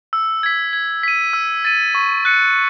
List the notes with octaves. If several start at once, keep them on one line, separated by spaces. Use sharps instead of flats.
E6
G#6 B6
G#6
B6 D#7
E6
A6 D#7
C#6
F#6 C#7